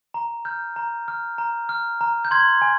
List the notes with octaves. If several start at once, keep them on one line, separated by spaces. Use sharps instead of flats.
A#5
F6 G6
A#5
F6
A#5
F6
A#5
G6
C6 G#6
G#5